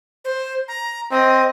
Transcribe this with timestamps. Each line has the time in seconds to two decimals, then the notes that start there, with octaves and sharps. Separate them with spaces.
0.25 C5
0.68 A#5
1.11 C4 D#5